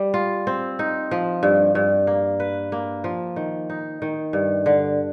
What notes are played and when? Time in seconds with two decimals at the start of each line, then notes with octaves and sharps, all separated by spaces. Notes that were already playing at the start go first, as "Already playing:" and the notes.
Already playing: G3
0.14 F4
0.47 C4
0.79 D#4
1.11 F3
1.43 G2
1.75 G2
2.07 A#3
2.40 B4
2.72 A#3
3.04 F3
3.36 D#3
3.70 D#4
4.02 D#3
4.33 G2
4.66 D3